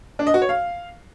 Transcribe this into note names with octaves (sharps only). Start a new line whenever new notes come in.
D4
D#5
F#4
C#5
F5